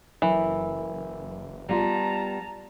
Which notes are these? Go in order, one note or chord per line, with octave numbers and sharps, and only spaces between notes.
F#1 F#2 E3
G3 B3 F4 A5 A#5